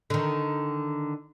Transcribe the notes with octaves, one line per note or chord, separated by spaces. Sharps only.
D3 D#3